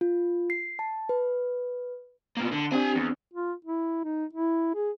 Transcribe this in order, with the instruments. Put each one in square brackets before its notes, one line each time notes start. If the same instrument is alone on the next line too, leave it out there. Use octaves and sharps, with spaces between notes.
[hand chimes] F4
C7
A5
B4
[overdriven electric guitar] B2 A#3
D3
[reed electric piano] C4 D4 [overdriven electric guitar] G4 G#5
[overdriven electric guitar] E2
[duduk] F4
E4
D#4
E4
G#4